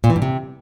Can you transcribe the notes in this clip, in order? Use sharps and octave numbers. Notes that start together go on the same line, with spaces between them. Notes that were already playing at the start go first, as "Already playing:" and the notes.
A#2
E3
G2
C3